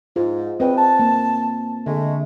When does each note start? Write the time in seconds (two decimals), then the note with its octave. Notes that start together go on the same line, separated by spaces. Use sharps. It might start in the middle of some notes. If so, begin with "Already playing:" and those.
0.16 G#2 F4
0.60 E2 C4 B4 D#5 G5
0.78 A5
0.99 A#3
1.86 D3 G#3 A3